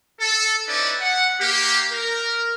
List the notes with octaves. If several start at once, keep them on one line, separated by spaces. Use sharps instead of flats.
A4
C#4 D#4 E4 B4 D5
F#5
A#3 G4
A#4